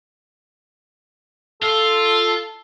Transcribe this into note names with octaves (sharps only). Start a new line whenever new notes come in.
F4 A4